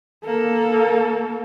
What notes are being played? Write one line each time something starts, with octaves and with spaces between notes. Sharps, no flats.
A#3 A4